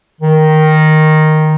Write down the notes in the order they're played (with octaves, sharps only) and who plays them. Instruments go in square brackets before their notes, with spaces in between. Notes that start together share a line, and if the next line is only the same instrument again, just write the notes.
[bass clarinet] D#3